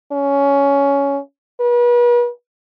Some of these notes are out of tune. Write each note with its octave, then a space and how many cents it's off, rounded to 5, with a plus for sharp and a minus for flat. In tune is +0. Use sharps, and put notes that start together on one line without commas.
C#4 +15
B4 -40